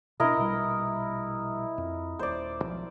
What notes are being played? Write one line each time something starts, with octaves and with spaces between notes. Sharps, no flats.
B2 D4 E4 A#4 D#5
A#1 B2 G3
F2
D#1 C5 D5
B1 F3